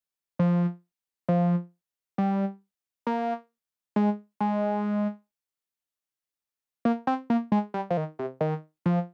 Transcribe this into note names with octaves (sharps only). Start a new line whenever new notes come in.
F3
F3
G3
A#3
G#3
G#3
A#3
C4
A#3
G#3
G3
F3
D#3
C3
D#3
F3